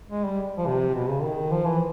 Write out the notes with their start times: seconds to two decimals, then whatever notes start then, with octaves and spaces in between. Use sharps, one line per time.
0.11 G#3
0.25 G3
0.58 F3
0.67 C3
0.95 B2
1.09 C#3
1.23 D#3
1.51 F3
1.66 E3